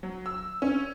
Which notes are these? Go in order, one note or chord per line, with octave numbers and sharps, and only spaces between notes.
F#3
E6
C#4